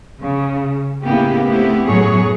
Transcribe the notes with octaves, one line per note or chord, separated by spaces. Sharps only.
C#3
A2 C#3 A#3 B3 E4 G4
A3 B3 C4 E4 G4
F#2 A2 F#3 B3 G#4 C#5